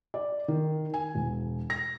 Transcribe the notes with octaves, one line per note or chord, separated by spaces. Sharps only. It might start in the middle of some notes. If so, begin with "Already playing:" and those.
D5
D#3
G#5
E1
A#6